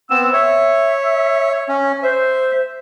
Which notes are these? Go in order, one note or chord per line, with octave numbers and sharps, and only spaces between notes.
B3 C4 E6
C#5 E5
C#4
C5 E5